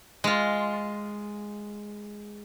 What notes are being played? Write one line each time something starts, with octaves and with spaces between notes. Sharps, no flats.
G#3 F4